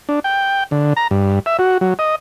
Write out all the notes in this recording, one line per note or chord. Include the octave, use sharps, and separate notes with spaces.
D4
G5
D3
A#5
G2
E5
F#4
F#3
D#5